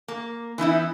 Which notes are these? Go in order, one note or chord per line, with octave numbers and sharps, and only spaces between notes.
A#3
E3 B3 D#4 E4